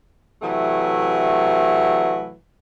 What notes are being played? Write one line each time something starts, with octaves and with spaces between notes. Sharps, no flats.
C3 E3 F#3 A3